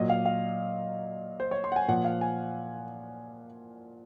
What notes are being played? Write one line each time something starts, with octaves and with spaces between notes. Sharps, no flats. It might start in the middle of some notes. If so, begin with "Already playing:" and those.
Already playing: A#2 F#3 D#5
F5
F5
C5
C#5
C6
F#5
G#5
A#2 F3 F#5
F5
G#5